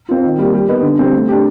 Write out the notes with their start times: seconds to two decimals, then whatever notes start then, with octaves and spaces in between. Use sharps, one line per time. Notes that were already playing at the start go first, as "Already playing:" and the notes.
0.09 C4 F4
0.24 D#3
0.38 G3 A#3
0.54 G3
0.69 B3 D#4
0.83 D3
0.99 G3 C4
1.13 A3
1.28 D4 G4